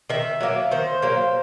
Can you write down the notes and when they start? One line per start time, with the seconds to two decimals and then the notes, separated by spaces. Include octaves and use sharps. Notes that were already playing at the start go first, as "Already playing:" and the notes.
0.10 D#3 E5
0.41 F#3 A#3
0.71 D#3 C5
1.02 F#3 A#3